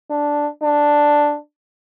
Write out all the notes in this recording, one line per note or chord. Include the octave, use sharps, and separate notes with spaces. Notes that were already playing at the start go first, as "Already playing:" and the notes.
D4
D4